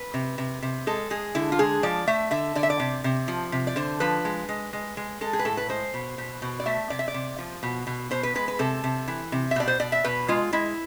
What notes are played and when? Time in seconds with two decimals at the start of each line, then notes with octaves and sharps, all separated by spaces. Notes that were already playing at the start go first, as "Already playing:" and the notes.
Already playing: B4
0.14 C3
0.38 C3
0.62 C3
0.87 G#3 A4
1.10 G#3 G#4
1.35 D3 E4
1.52 F4
1.59 G#3 G#4
1.83 F3 D5
2.07 A3 E5
2.31 D3 E5
2.55 D3 D5
2.63 E5
2.70 D5
2.80 C3
3.04 C3
3.28 F3
3.52 C3
3.67 D5
3.76 D3 C5
4.00 F3 B4
4.25 G#3
4.49 G#3
4.73 G#3
4.97 G#3
5.21 G#3 A4
5.33 G#4
5.39 B4
5.45 A2 A4
5.57 B4
5.69 G#3 C5
5.94 B2
6.18 B2
6.42 B2
6.60 D5
6.66 A3 E5
6.90 C3 D5
6.99 E5
7.08 D5
7.14 C3
7.38 F3
7.63 B2
7.87 B2
8.11 B2 C5
8.23 B4
8.35 G#3 B4
8.48 B4
8.59 C3 A4
8.84 C3
9.08 E3
9.32 C3
9.51 E5
9.56 B2 D5
9.68 C5
9.80 B2 D5
9.92 E5
10.04 B2 B4
10.28 G#3 F4
10.53 G#3 E4